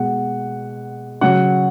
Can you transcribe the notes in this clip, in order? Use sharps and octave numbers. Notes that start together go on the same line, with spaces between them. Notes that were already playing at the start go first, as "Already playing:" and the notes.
Already playing: B2 G#3 F#5
C#3 F#3 F#5